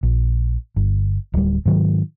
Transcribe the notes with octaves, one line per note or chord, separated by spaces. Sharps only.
A#1
G1
D1 G3
G#2 D#3 F#3